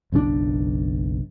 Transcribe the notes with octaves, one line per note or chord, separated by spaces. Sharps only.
F#1 B1 A2 D4